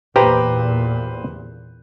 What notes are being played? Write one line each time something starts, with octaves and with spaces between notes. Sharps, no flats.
E2 A#2 G4 B4 C5 G5 A#5